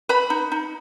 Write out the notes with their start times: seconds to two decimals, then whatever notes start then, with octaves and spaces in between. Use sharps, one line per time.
0.09 B4 B5
0.30 D#4
0.52 D#4